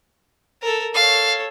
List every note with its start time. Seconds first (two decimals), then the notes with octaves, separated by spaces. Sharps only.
0.62 A4 A#4
0.94 A4 C#5 F5